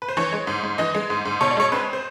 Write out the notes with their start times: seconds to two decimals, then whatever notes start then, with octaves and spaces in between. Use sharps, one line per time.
0.02 B4
0.09 C5
0.17 E3 C#5
0.32 G#3
0.47 G#2
0.63 G#2
0.78 E3 D#5
0.95 G#3
1.10 G#2
1.25 G#2
1.41 B2 C#5
1.51 D5
1.57 G#3 C#5
1.72 C4 B4
1.93 C5